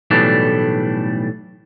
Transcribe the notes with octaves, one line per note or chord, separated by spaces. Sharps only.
B1 A2 E3 G3 A3 D4